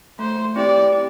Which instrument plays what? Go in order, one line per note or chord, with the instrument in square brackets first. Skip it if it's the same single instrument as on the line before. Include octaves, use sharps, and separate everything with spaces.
[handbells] A3 [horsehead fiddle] C5
[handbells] C4 E4 G4 [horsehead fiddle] D5
[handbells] G4